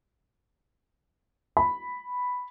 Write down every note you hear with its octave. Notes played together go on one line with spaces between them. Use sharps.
B5